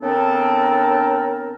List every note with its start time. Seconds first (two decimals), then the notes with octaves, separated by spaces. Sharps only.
0.02 C#3 B3 C4 D4 A4 A#4